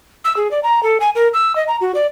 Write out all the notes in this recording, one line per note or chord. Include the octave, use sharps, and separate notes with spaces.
E6
G#4
D5
A#5
A4
G#5
A#4
E6
D#5
A#5
F#4
D5